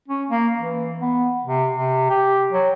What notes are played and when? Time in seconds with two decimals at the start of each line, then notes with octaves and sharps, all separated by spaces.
0.08 C#4
0.30 A#3
0.59 E3
1.01 B3
1.45 C3
1.72 C3
2.10 G4
2.53 F#3